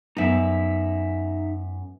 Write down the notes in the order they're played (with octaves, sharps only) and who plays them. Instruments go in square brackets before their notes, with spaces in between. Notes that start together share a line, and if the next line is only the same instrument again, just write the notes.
[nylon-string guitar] F#2 B3 [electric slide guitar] D#4 E5